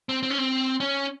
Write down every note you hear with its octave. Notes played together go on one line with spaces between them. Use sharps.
C4
C4
C#4
C4
C#4